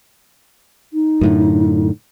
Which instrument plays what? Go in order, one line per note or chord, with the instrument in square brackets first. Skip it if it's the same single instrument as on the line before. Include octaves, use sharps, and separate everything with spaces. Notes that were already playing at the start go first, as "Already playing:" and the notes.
[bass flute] D#4
[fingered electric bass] F#2 A2 D3